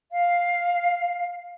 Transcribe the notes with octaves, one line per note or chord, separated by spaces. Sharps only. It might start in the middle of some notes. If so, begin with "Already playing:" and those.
F5